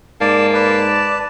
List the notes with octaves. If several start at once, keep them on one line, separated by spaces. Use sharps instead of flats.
G#2 A#3 D5 A5
B4 D5 A5